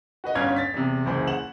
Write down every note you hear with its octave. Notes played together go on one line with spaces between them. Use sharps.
F#4 B4 D#5
G1 G2 C#4 C#5 F5 G#6
A6 B6
E2 C3
F#1 C#2 E3 G#4 C5 B5
F#5 E7 F#7